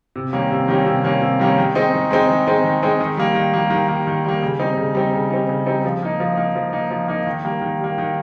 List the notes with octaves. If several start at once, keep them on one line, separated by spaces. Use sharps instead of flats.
C3
D#3 G3 A#3 C#4
C3
D#3 G3 A#3 C#4
C3
D#3 G3 A#3 C#4
C3
D#3 G3 A#3 C#4
D#3
G#3 C4 D#4
D#3
G#3 C4 D#4
D#3
G#3 C4 D#4
D#3
G#3 C4 D#4
D#3
G3 A#3
D#3
G3 A#3
D#3
G3 A#3
D#3
G3 A#3
C#3
G3 C4 D#4
C#3
G3 C4 D#4
C#3
G3 C4 D#4
C#3
G3 C4 D#4
F3
A#3 D#4
F3
A#3 D#4
F3
A#3 D#4
F3
A#3 D#4
D#3
G3 A#3
D#3
G3 A#3
D#3